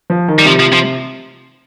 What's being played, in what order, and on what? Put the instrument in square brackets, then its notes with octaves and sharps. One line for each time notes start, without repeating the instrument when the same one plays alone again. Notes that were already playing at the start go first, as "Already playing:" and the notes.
[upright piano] F3
D#3
[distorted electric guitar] G3
[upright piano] C3 [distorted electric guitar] F3
[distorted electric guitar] F3
F3